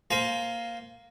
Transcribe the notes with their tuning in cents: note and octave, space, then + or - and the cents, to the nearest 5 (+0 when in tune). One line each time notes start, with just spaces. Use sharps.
A#3 +0 C5 +0 G#5 +30